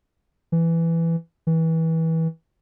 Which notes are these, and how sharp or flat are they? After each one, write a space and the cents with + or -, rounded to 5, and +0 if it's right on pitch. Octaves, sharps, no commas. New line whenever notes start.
E3 +10
E3 -25